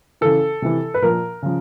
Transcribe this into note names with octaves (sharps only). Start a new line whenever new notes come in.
C#3 E3 A4
C3 E3
B4
A#2 F3 A#4
C#3 F3